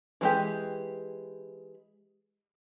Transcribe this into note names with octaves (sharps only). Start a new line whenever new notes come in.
E3 G#3 G4